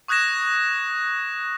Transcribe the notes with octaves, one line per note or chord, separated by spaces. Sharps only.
C#6 D#6 F#6 G#6 A#6 E7